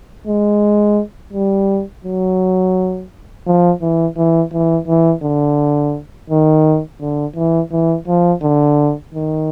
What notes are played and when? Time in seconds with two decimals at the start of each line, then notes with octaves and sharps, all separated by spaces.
0.27 G#3
1.33 G3
2.05 F#3
3.47 F3
3.82 E3
4.17 E3
4.53 E3
4.88 E3
5.23 D3
6.30 D#3
7.01 D3
7.36 E3
7.72 E3
8.08 F3
8.43 D3
9.14 D#3